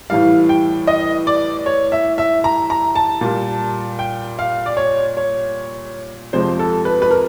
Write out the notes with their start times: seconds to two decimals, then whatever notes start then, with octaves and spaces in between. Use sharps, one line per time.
0.10 A2 E3 G3 F5
0.49 G5
0.87 D#5
1.27 D5
1.66 C#5
1.92 E5
2.18 E5
2.44 A#5
2.70 A#5
2.95 A5
3.21 A#2 G3
3.99 G5
4.39 F5
4.66 D5
4.77 C#5
5.17 C#5
6.33 F2 C3 F3 G#3 C5
6.59 A4
6.85 B4
7.02 B4
7.11 A#4